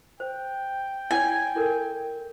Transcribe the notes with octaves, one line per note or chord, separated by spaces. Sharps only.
C5 G5
E4 C#5 G#5
E4 A4 A#4